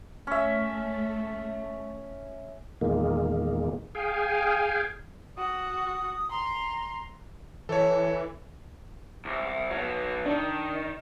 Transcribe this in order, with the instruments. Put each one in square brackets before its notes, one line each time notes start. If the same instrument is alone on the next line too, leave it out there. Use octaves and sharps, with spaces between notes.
[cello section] A3 [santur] C#4 E5
[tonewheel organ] E2 A#2 D#3 G#3 A#3
G#4 F5 G5 G#5
[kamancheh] F#4 [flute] D#6
[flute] A#5 [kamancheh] C6
[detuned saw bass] E3 [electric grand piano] A4 C#5
[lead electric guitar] C2
B2 F#3
[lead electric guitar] D#3 [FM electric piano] D4